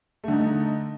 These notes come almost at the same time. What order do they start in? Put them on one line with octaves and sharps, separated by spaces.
A3 D3 D#4